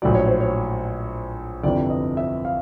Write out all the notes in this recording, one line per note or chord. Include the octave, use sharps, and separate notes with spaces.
A#1 A2 F#3 D5
C#5
C5
C#5
G1 F2 C3 E3 D5
D#5
E5
F5